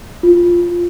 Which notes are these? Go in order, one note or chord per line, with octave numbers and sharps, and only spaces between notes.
F4